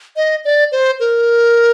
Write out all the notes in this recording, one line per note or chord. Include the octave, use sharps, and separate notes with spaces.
D#5
D5
C5
A#4